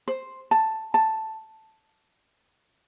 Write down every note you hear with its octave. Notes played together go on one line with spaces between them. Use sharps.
C5
A5
A5